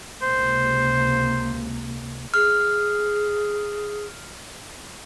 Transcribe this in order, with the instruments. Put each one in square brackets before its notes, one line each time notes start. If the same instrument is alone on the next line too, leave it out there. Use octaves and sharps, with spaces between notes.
[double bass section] C#2 C3 A#3 [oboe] C5
[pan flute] G#4 [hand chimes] F6